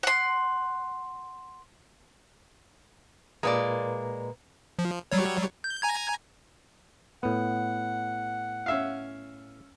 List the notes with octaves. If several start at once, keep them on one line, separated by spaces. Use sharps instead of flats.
F#5 C6
A#2 G#3 A#3 B4 D5 A#5
F3
F#3 G3 C#5
G6
G#5 A#5 G#6
A2 B3 F#5
C#4 E5 F5